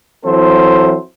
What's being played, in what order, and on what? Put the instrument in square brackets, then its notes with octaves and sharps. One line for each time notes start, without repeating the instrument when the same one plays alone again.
[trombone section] E3 F#3 C4 E4 A4 C5